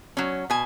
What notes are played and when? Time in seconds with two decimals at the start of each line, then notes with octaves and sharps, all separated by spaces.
0.17 F#3 C#4
0.50 B2 G#5